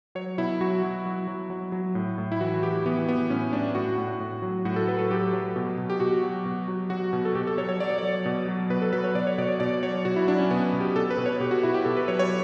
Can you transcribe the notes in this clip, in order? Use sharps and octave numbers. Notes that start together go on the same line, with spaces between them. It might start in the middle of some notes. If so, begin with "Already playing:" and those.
F#3 C#5
B2 E4
F#3 F#4
F#3
F#3
F#3
F#3
F#3
A2
A2
E4
E3 F#4
E3 G4
E3 B3
E3 B3
A2 C#4
A2 D4
A2 F#4
A2
A2
F#3
A2 F#4
A4
F#3 B4
A4
F#3 G4
F#3
B2
B2
G4
B2 F#4
F#3
B2
F#3
F#3 F#4
B2
A4
B2 G4
A4
F#3 C#5
C#5
F#3 D5
C#5
F#3 D5
B2
F#3
B2 B4
A4
F#3 B4
C#5
B2 D5
C#5
B2 D5
C#5
B2 D5
F#3 C#5
B2 F#4
E4
F#3 D4
C#4
B2 B3
B2
G4
B2 A4
B4
B2
C#5
B2 G4
F#4
B2 E4
G4
B2 A4
B4
F#3 C#5
C#5